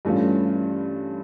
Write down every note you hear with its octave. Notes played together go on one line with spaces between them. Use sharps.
G2 E3 A3 C#4 F4